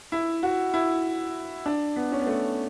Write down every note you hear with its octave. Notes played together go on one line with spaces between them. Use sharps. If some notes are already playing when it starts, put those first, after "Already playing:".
E4
F#4
E4
D4
B3
C#4
B3
A3